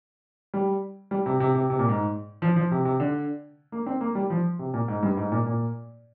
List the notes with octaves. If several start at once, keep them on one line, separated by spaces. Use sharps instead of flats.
G3
G3
C3
C3
C3
C3
A#2
G#2
F3
F3
C3
C3
D3
A#3
C4
A#3
G3
F3
C3
A#2
G#2
G2
G#2
A#2
A#2